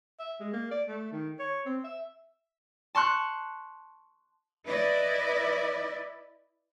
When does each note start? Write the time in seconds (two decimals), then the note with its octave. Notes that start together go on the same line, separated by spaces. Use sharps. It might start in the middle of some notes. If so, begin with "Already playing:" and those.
0.19 E5
0.40 G#3
0.53 A#3
0.71 D5
0.87 A3
1.12 D#3
1.39 C#5
1.66 C4
1.84 E5
2.95 A5 C6 C#6 F#6
4.66 E4 B4 D5 D#5